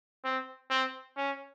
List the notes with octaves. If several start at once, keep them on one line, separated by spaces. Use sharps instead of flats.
C4
C4
C#4